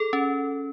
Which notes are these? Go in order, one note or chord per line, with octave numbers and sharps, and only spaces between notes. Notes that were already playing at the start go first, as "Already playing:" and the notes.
Already playing: G#4 A4
C#4